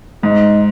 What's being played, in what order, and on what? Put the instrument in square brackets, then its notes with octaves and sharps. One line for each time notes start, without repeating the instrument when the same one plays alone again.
[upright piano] G#2 [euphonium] D#4